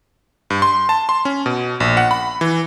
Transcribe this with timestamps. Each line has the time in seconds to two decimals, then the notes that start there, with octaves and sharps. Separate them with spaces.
0.50 G2
0.62 C6
0.89 A5
1.09 C6
1.25 C#4
1.46 B2
1.80 A#1
1.97 F#5
2.11 B5
2.41 E3